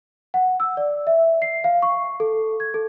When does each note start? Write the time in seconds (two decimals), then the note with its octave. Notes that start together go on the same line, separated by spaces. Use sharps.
0.34 F#5
0.60 E6
0.77 D5
1.07 E5
1.42 C7
1.64 F5
1.82 C#6
2.20 A4
2.60 G#6
2.74 A4